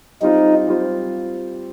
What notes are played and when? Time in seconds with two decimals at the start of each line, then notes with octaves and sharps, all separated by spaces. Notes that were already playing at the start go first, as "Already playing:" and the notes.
0.21 G3 C4 D#4 F4
0.67 G3 C4 F4